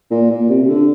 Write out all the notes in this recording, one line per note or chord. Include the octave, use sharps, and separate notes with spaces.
A#2
A#2
C3
C3
D3